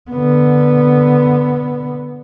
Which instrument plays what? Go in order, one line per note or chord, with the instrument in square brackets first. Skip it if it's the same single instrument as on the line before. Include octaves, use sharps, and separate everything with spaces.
[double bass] D3 B3